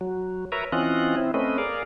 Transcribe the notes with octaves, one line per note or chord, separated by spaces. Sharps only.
F#3
A#4 B4 C#5 E5 A#5
E3 C4 C#4 F4 D#5 F#6
C4 E4
A3 C4 C#4 B4 D#5
G#4 A#4 D5 F5